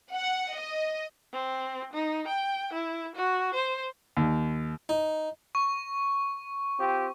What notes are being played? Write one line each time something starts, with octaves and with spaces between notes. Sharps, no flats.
F#5
D#5
C4
D#4
G5
E4
F#4
C5
D#2
D#4
C#6
C4 F4 G4